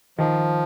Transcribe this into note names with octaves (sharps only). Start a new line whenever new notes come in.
D#3 F3